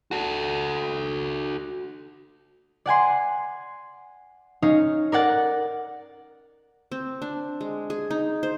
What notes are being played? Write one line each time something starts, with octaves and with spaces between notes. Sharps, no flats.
F#4 A4
D5 F#5 G#5 C6
C#4 D#4 C#5 F5
A#4 D5 F#5 A6
C4
D4
G#3
G#4
D#4
C5